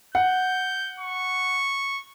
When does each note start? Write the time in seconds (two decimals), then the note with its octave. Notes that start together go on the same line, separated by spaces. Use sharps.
0.15 F#5 G6
1.00 C#6